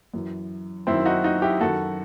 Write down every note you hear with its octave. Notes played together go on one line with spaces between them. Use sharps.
F#2 E3
F#2 D#3 C4 E4
D#4 F#4
D#4 F#4
E4 G4
F#2 D#3 F#4 A4